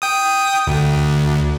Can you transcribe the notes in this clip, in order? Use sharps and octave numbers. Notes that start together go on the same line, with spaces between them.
G5 D#6
D2